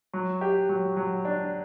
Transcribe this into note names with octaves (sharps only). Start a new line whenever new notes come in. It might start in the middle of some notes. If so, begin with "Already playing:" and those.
F#3
G4
F#3
F#3
D4